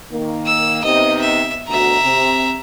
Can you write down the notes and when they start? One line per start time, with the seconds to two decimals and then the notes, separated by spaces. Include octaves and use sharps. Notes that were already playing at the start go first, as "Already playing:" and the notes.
0.11 D#3 A#3
0.46 E6
0.84 C3 B3 D#4 D#5
1.21 E5
1.68 D2 B2 F#4 E5 A#5
2.02 C3